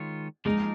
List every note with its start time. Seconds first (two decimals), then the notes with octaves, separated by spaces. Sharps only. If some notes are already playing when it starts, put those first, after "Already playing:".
Already playing: D#3 G#3 F4 C#5
0.45 F3 G#3 A#3 D#4 A#4